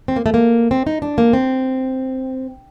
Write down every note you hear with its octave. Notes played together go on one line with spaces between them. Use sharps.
C4
A#3
A3
A#3
C4
D#4
D4
A#3
C4